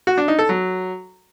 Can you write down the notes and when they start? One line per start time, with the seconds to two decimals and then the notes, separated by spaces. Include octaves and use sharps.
0.07 F#4
0.18 D4
0.28 D#4
0.39 A4
0.49 F#3